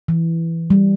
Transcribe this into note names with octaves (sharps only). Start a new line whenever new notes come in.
E3
G3